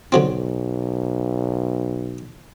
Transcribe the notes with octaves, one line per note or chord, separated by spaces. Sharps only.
B1 D3 F#3 C4